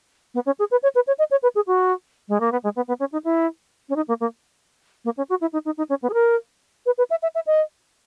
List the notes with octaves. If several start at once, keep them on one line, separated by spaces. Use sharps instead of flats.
B3
C#4
G#4
B4
C#5
B4
C#5
D#5
C#5
B4
G#4
F#4
G#3
A#3
B3
G#3
B3
B3
C#4
D#4
E4
C#4
D#4
A#3
A#3
A#3
C#4
F#4
E4
D#4
D#4
D#4
C#4
B3
G#4
A#4
B4
B4
E5
E5
E5
D#5